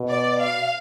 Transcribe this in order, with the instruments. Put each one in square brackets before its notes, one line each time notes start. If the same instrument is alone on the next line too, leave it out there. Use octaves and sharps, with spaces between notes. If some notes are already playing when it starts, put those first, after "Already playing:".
Already playing: [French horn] B2
[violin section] D5
F5